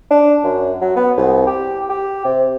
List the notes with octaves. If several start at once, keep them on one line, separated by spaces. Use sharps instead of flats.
D4
F#2
F#3
B3
C2
G4
G4
C3